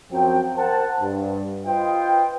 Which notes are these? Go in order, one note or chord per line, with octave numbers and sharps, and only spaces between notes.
F#2 F3 F#3 C4 G5
A#4 C5 F#5 A5
G2
F4 B4 C5 D#5 G5